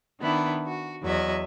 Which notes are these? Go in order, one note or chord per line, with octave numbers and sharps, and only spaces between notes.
D#3 B3 D4 E4
F#4
E2 F#3 D#5 E5